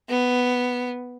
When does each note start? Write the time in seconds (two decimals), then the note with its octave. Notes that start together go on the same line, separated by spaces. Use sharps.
0.09 B3